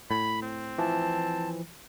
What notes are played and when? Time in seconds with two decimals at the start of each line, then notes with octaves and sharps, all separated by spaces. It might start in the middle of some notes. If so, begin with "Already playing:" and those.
0.11 A2 B5
0.42 C4
0.78 E3 F3 A5